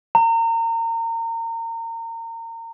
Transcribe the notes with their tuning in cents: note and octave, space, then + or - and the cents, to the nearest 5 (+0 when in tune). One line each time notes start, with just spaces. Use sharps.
A#5 -30